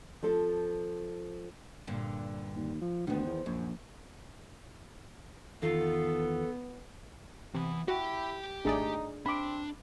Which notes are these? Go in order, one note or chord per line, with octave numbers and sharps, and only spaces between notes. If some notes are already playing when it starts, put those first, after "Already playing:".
F3 C4 A4
G2 A#2 D3
D#2
F3
D2 D#3 F3 B3
E2
A#1 F#2
E2 D#3 B3 F4 A4
C3 E3 B3
E4 F#4 G4 G5
G#1 A3 D4 D#4 G#4 D5
C4 D4 B5 D6